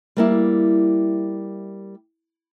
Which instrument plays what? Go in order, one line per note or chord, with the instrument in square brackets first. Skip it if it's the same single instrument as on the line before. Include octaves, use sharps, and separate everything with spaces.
[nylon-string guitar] G3 A#3 E4